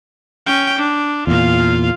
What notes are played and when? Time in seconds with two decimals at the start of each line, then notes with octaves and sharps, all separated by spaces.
0.46 C#4 G5
0.78 D4
1.27 E2 A#2 F4 F5